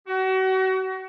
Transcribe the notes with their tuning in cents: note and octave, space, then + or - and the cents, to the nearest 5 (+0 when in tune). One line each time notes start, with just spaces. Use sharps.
F#4 +35